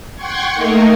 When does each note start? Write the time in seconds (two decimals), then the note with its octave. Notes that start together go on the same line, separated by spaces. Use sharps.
0.15 F#5 G5 C6 C#6 G#6
0.54 A3 A#3 D#4 A#4